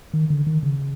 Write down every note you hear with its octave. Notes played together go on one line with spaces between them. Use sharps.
D#3
D3
D#3
C#3